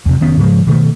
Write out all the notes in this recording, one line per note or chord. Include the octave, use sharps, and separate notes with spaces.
E2 C3
F1 D#3 B3 C#4
G#2 C#3 F3 G#3
B2 D#3 G#3 A3